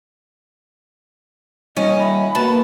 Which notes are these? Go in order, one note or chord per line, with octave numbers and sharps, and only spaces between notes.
G3 C#4 D#4 F4 D#5
E5 B5
A3 A#3 F#4 B4 A5